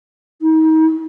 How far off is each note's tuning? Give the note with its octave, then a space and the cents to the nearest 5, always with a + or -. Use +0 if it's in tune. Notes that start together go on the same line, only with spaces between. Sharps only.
D#4 +30